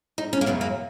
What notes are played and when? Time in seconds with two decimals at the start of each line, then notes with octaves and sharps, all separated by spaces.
0.18 D#4
0.33 C#4
0.41 A#3
0.46 F#2 C#3 F#3 B3
0.61 A#3